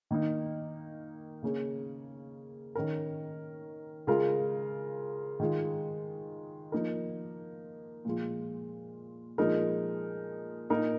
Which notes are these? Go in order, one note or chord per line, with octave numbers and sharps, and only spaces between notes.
D#3 A#3 D#4
C#3 A#3 C#4 G#4
D#3 C#4 A#4
C#3 G#3 F4 A#4
D#3 G#3 F4
F3 A#3 D#4 A#4
A#2 F3 G#3 F4
A#2 F3 G#3 D#4 A#4
A#2 A#3 D#4 A#4